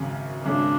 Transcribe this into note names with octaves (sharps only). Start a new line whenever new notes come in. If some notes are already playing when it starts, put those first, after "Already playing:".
Already playing: G#1 F#2 C#3
G#1 F#2 C#3 D4